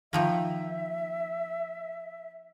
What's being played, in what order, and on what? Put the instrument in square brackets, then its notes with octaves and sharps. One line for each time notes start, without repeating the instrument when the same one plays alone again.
[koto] D#3 F3 A#3 [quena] E5